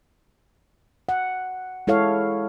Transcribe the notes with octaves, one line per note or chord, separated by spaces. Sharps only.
F#5
G#3 E4 A4 C#5 F5